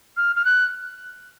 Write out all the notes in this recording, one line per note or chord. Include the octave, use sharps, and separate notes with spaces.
F6
F6
F#6